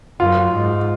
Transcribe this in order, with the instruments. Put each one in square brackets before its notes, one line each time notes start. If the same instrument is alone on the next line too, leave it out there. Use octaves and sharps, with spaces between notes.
[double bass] F#2 [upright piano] F4
[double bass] G#2